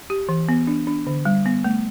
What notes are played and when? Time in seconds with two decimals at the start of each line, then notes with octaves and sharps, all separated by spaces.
0.10 G4
0.29 E3
0.49 B3
0.67 D4
0.87 D4
1.07 D3
1.25 G3
1.46 B3
1.64 A3